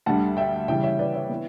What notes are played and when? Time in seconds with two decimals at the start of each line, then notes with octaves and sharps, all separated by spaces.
0.06 D2 D3 G3 F#5 A5
0.37 E5 G5
0.68 C#3 E3 G3 E5 G5
0.83 C#5 E5
0.99 B4 D5
1.14 C#5 E5
1.29 E3 B3